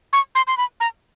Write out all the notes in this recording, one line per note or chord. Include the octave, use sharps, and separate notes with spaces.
C#6
C6
C6
B5
A#5